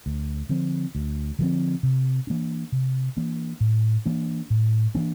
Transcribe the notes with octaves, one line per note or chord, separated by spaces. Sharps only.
D2
D3 F3 C4
D2
D3 F3 C4
C3
E3 A#3 D4
C3
E3 A#3 D4
A2
E3 A#3 D4
A2
E3 A#3 D4